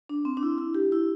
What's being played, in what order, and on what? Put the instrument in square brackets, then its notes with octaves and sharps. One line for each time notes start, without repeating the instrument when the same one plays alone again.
[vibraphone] D4
C4
D4
E4
E4
G4
E4